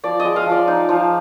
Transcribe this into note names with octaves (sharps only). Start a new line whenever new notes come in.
F3 D5
D#5
G#3
F5
F3
D5
D#4
F3